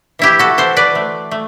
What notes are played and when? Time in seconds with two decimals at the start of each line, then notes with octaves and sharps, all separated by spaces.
0.19 E3 E4 G4
0.39 F#4 A4
0.58 E3 A4 C5
0.76 B4 D5
0.95 A3
1.31 A3